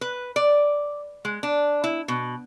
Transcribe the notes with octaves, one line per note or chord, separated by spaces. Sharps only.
B4
D5
G#3
D4
E4
B2